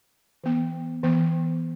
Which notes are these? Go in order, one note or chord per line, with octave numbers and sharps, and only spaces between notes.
E3 B3
E3 B3